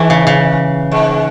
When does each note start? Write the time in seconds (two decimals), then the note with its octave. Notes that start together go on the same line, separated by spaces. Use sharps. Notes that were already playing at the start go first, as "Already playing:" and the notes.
Already playing: G#2 E3
0.10 C#3
0.27 C#3
0.92 G#2